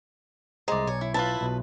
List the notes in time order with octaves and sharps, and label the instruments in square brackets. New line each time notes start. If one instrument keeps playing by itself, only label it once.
[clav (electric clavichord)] C2 C5 [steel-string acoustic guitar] G#3 [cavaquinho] D5 A#5
[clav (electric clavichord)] B1 G#5 [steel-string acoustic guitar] C#5
[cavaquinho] E4
[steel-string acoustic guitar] E4 [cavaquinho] F4 B4 A5
[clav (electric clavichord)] B1 B2